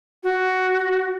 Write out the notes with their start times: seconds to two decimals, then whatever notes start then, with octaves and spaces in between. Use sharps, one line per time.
0.23 F#4